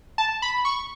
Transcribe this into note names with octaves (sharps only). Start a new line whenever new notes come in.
A5
B5
C#6